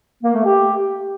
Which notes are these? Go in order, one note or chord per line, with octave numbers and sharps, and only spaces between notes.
A#3
A3
G4